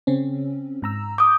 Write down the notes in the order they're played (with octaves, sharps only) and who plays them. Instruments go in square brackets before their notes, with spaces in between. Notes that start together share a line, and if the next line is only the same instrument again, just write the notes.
[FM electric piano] C#3 C4 C#4
G#2 A#5 E6
[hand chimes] D6 D#6 [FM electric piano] G6